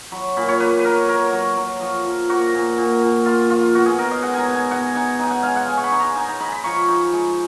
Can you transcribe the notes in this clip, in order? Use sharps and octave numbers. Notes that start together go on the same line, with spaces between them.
F#3 B5
A#2 B5
C#5
A#3 B4
B4
F#3 A#4
F#3 A#4
F#3
F#3
F3
F3
A#3 F#4
A#2
A#2
A#2
A#3 F4
F3 F4
B2 F#4
G#4
D#4 A#4
D#5
G#3 F#5
G#5 A#5
B2
G#5
B2 F#5
D#4 G#5
D#4 G#5
F#5
G#3 F5
F#5
G#3 G#5
C#6
B5
D#4
A#5
D#4 G#5
A#5
D#4 B5
B5
F3 C#6
D#4
G#3